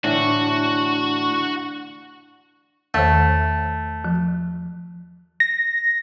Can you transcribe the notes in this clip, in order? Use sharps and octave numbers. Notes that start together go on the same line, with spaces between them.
A2 D3 E3 D4 F#4
E2 D#3 A3 C5
F3
A#6